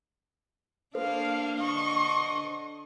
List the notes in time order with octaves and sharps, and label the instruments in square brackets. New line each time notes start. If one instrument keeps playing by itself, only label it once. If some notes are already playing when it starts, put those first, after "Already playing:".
[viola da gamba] A#3 D4 [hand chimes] A4 B4 C5 [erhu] F5
[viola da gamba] D3 D4 D#5 [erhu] C#6